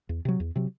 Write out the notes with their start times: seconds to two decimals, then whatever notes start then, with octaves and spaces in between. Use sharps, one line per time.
0.09 E2
0.25 C3 F#3
0.40 E2
0.56 C3 F#3